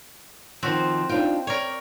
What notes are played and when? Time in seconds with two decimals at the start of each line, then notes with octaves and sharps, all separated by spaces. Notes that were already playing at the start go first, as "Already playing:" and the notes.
0.63 D#3 F3 C4 F#4
1.09 D4 D#4 F4 G5
1.47 A#4 C#5 D5